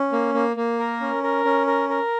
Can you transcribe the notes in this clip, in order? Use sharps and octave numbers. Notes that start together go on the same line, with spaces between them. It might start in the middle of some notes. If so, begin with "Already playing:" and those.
Already playing: C#4
A#3
A#3
A#3
A#4
C#4
A#4
C#4
A#4
A#4